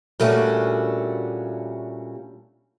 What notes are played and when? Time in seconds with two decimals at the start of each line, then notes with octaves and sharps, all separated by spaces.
0.20 A#2 G3 A3 C#4 D4 F#4